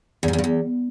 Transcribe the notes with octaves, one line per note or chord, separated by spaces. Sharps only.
E2
G#2
E2
G2
E2